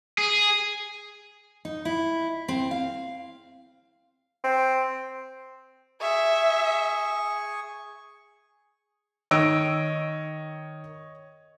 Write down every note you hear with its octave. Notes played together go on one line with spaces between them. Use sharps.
G#4
D#4
E4
C4
F5
C4
G#4 E5 C#6
D#3 C#5 D#5 E6 D7